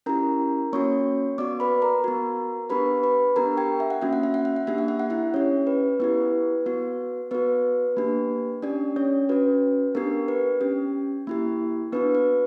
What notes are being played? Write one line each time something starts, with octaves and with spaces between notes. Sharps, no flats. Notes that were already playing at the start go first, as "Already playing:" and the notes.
C#4 E4 G4 A#4 A#5
A#3 C#4 F#4 C#5 C#6
B3 F#4 D5 D6
B4 B5
A#4 A#5
B3 F#4
B3 D4 G4 B4 B5
B4 B5
B3 D4 G4 A#4 A#5
G4 G5
E5
F#5
A#3 C#4 F#4 E5
F#5
E5
F#5
E5
F#5
A#3 D4 G4 E5
F#5
E5
F#5
E4 E5
C#4 G4 C#5
B4
B3 E4 G4 B4
B3 F#4
B3 F#4 B4
A#3 D4 G4
C#4 D4 G4 D5
C#4 C#5
C#4 F#4 B4
B3 D4 G4 A#4
B4
C#4 G4
A#3 E4 G4
B3 D4 F#4 B4
B4